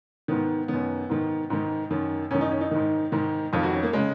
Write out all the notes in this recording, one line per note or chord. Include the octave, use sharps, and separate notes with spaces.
G#2 D#3 B3
F#2 D#3 B3
G#2 D#3
G#2 D#3
F#2 D#3
F#2 D#3 C#4
D#4
C#4
D#4
G#2 D#3
G#2 D#3
F2 D#3 F4
F#4
C#4
A#3
C#3 G#3